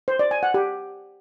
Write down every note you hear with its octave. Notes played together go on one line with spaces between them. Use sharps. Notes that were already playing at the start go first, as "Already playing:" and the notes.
C5
D5
G#5
F#5
G4